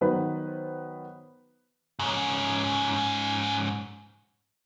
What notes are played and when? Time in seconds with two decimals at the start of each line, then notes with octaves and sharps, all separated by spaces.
0.01 D#3 F#3 B3 B4 C5
1.99 G#2 C#4